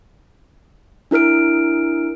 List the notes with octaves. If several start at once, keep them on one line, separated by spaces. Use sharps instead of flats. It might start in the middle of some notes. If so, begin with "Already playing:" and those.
D4 E4 A#4 F6 D7